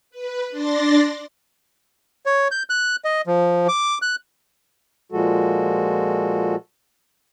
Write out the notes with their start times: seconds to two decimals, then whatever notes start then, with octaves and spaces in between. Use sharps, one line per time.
0.10 B4
0.50 D4 D5 C6 A6 A#6
2.26 C#5
2.51 G6
2.70 F#6
3.05 D#5
3.27 F3
3.69 D6
4.02 F#6
5.12 A#2 F3 G#3 F#4 A4